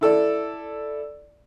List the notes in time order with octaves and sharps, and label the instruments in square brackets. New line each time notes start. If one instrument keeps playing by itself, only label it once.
[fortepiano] E4 A4 D5